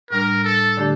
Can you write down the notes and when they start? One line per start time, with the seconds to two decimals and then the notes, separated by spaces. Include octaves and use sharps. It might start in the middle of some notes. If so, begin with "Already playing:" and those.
0.10 A2 G3 D4 A#4
0.44 A4
0.77 D3 A3 D4 G4 D5